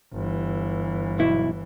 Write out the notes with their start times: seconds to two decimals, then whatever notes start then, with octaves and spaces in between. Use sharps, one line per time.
0.13 G1 E3
1.19 B1 E4